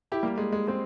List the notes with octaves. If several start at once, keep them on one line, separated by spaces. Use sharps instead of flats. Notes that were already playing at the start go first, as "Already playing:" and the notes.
E4 G4
G3 A#3
G#3
G#3
G#3 C4